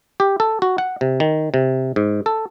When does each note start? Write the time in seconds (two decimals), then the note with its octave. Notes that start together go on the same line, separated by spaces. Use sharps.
0.20 G4
0.40 A4
0.62 F#4
0.78 F#5
1.01 C3
1.20 D#3
1.54 C3
1.96 G#2
2.26 A4